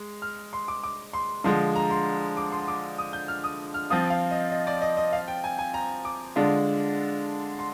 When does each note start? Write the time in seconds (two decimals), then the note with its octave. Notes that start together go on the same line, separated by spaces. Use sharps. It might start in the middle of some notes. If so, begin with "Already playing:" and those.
Already playing: G#3
0.22 F6
0.53 C6
0.68 D6
0.84 D6
1.13 C6
1.44 D3 F3 G#3 C6
1.75 A#5
1.90 C6
2.37 D6
2.52 C6
2.68 D6
2.98 D#6
3.13 G6
3.28 F6
3.44 D#6
3.74 F6
3.90 F3 C4 F4 D#6
4.10 F5
4.31 D#5
4.51 D#5
4.67 D5
4.82 D#5
4.97 D#5
5.13 F5
5.28 G5
5.44 G#5
5.59 G#5
5.74 A#5
6.05 D6
6.36 D3 G#3 D4 F4
7.59 C6